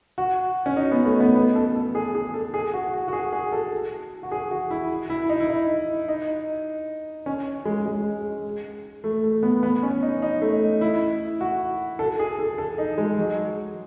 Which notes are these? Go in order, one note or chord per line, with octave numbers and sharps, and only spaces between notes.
F#4
C#4
D#4
B3
A3
B3
B3
A4
A4
G#4
G#4
A4
G#4
F#4
F#4
F#4
G#4
G#4
A4
F#4
G#4
F#4
E4
E4
D#4
E4
D#4
D#4
C#4
G#3
G#3
A3
A3
B3
B3
C#4
D#4
D#4
A3
E4
F#4
A4
G#4
A4
A4
D#4
G#3
F#3